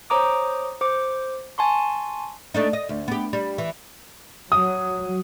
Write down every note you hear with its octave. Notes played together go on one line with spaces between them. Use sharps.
C5 C#5 A#5 D6 D#6
C5 D6
G#5 A5 C6 C#6
A3 D4 D#4
D#5
D2
B3 G4
G3
E3
F#3 D#6